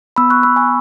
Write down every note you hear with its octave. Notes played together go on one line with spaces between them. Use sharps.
B3 B5 E6
C#6 F#6
B3 B5 E6
G#5 C#6